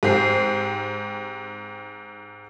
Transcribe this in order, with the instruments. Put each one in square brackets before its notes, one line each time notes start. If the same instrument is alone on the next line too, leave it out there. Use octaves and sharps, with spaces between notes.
[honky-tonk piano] G#2 C4 G4 C7